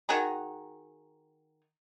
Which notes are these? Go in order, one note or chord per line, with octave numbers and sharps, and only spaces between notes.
D#3 F#4 G#4 A#5